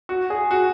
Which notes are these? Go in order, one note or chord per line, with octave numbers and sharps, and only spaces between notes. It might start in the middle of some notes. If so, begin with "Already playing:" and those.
F#4
G#4
F#4